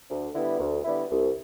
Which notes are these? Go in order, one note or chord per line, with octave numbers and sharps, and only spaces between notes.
D2
D3 G3 B3 E4
D2
D3 G3 B3 E4
C2